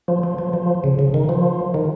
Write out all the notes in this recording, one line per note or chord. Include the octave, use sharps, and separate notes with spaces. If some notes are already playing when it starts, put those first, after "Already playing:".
F3
F3
F3
F3
C#3
C#3
D#3
F3
D#3